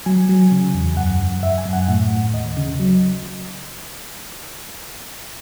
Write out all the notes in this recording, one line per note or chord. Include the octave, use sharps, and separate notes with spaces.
F#3 G#5
F#3
C#3
E2
F#2 F#5
F#2
F#2 E5
G#5
F#2
F#5
A2 F#5
A2
D#2 D#5
C#3
F#3